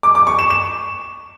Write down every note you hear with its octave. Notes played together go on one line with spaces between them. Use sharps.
D6
D6
C#6
E7
E7